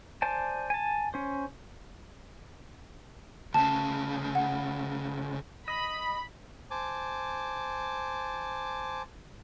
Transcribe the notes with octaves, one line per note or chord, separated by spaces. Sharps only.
C5 D5 G#5 A5
G#5 A5
C#4 C5
D2 C#3 A5
F#5
D#5 B5
C5 G#5 A5 D6